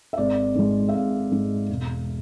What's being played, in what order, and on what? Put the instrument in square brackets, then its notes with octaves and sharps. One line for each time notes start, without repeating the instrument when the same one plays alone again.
[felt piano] E5
G#1 D5
G#2 G#3
E5
G#1 F5
G#2 G#3
E1